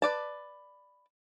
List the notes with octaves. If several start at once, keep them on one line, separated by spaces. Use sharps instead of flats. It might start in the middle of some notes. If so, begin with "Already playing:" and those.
B4 D5 A5